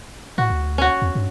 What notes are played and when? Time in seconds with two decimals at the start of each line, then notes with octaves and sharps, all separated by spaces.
0.38 A2 F#4
0.50 D2
0.78 C#4 F#4
1.02 E2
1.15 G2